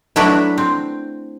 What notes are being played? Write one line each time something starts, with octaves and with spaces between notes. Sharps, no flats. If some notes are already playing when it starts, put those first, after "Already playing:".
F#3 A3 D4 E4 F#4 B4
C4